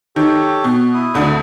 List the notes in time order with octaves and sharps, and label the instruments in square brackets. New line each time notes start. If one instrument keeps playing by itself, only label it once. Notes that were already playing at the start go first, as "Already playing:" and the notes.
[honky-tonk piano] D#3 [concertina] G4 A4 C#5
[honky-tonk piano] B2
[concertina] E4 D#6
[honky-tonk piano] G#1 D2 D3